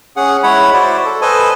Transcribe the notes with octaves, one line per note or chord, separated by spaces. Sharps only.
C#4 G#4 F#5
G#3 E4 C#5 F#5 B5
E4 F#4 C5 D5
A4
A4 B4 C5 D#5 G#5